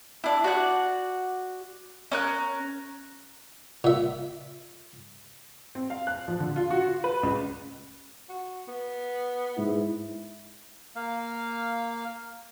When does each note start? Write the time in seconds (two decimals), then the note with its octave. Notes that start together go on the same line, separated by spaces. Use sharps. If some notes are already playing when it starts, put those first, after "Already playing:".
0.24 D4 E4
0.44 F#4 D5 F#6
2.12 C#4 A#4 F#6
3.84 A#2 E5
5.75 C4
5.90 F5
6.07 F#6
6.28 F3
6.40 D3
6.56 F4
6.70 F#4
6.86 F4
7.04 B4
7.23 C#2
8.29 F#4
8.68 B3
9.58 G#2 E4
10.96 A#3 F5